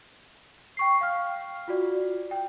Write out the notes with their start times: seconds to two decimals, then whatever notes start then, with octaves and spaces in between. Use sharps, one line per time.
0.77 G5 C#6 C7
1.01 F5 G5 F6
1.68 F4 F#4 D5
2.31 G5